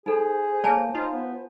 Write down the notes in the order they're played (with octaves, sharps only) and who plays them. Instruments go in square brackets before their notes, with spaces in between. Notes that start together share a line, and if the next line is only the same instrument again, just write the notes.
[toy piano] D#4 A4 [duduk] G#4 [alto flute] C5
[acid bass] A#3 [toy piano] C#5 G#5 A5
[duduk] D#4 [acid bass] F4
[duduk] B3